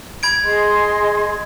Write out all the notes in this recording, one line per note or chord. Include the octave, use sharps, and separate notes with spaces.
B5 G#6 D7
G#4 D#5 C6